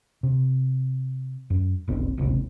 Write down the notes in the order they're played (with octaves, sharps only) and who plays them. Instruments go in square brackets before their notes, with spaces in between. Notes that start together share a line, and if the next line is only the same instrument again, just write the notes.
[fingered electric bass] C3
F#2
F1 B1 C4
D1 G#1 C#2 C3